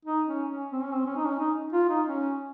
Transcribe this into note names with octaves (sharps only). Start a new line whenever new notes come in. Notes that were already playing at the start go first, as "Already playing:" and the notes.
D#4
C#4
C#4
C4
C#4
C4
C#4
D#4
C#4
D#4
F4
D#4
C#4